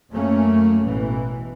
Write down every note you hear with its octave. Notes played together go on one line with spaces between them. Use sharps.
F#2 A3 A#3 C#4
A1 B2 E3